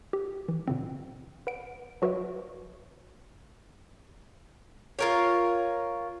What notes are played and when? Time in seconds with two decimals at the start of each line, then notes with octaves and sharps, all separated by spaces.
0.13 G4
0.48 E3
0.68 A#2 C#3 C4
1.47 B4 F#5 D7
2.02 F#3 F#4 B4 C#5 E5
4.99 F4 A#4 C#5